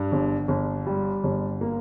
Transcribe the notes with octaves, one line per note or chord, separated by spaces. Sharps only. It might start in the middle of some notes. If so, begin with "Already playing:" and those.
Already playing: G2
G1
G1
G3
G1
A#3